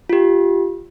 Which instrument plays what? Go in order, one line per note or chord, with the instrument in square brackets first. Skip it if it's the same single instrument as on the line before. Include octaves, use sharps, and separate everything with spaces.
[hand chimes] F4 G4